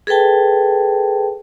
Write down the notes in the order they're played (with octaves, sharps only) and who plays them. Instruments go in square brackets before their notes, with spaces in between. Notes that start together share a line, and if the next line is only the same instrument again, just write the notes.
[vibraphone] G#4 A4 B4 G5 A5